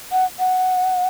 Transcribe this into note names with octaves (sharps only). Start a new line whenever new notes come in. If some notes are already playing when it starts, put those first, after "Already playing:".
F#5
F#5